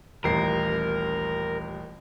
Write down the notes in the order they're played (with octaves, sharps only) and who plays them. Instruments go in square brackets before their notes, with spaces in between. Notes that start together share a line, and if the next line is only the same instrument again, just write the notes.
[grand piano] D#1 A1 C7 [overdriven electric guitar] A#4